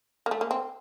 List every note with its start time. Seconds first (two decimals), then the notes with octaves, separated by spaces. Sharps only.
0.26 A#3
0.31 A3
0.41 A#3
0.51 C4